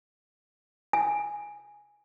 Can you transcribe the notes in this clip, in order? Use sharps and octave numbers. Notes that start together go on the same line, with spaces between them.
G#5